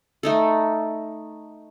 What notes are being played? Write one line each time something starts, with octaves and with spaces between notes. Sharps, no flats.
A3 D#4 A4